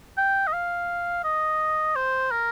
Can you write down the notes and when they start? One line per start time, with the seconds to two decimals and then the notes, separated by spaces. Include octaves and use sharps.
0.18 G5
0.47 D#5
0.53 F5
1.24 D#5
1.96 C5
2.31 A#4